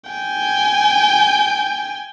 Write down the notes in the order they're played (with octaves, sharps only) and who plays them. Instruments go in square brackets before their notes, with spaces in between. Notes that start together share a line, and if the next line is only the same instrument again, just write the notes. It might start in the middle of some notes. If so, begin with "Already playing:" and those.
[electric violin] G5 G#5